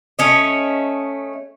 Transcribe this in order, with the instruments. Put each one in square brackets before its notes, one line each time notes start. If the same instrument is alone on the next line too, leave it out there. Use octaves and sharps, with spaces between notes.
[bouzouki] A3 C#4 D#5